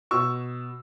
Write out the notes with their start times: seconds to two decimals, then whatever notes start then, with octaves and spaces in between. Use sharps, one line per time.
0.11 B2 C#6 E6